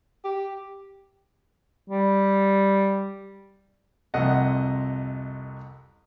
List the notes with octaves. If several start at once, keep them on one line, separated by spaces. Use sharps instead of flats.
G4
G3
C2 F2 C3 D#5 F#5